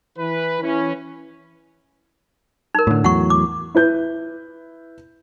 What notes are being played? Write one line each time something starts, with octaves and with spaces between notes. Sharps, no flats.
E3 B4
E3 C#4
D#4 A#4
A2 D3
E2 A2 F#3 F#5 C#6
D6
E4 B4 G6